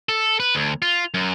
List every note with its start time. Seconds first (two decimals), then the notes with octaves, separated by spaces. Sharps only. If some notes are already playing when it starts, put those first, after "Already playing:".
0.09 A4
0.40 B4
0.55 D2
0.82 F4
1.14 F#2